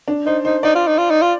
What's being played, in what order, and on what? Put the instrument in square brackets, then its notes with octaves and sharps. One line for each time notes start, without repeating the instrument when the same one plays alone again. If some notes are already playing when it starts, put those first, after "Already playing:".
[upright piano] D4
[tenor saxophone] D#4 [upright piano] C5
[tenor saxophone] D#4 [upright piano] C5
[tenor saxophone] D#4 [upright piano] D5
[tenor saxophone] F4
D#4
F4
D#4
F4